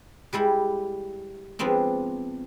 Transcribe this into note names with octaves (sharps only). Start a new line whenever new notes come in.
G3 G#3 E4 G4
F3 G#3 B3 C4 D4